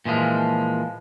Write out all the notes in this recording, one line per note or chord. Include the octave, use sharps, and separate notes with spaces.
A#2 E3 F3 G#3